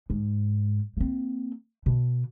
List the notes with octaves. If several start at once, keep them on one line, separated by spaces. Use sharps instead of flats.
G#2
A#3 C4
B2